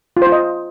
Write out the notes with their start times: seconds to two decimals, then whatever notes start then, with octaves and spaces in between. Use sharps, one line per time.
0.17 F4
0.22 C5
0.27 F4
0.32 D#5